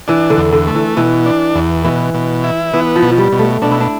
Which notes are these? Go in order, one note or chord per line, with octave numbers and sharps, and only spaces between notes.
E3 D4
D3
E2
D3
A3
E3
B2 E3
D4
E2
B2 E3
B2
E4
E3 B3
F3
B2
F3
G3
B2
A3
B2 D4
E4
D4